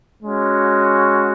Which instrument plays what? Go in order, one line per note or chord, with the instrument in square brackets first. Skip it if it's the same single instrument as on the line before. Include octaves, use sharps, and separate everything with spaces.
[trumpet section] G#3 C#4 F#4